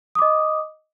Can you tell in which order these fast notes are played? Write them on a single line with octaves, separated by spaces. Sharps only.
D#6 D6 D#5